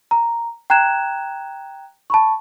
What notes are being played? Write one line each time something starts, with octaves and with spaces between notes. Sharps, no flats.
A#5
G5 A#5 F#6 G#6 E7
A5 B5 C#6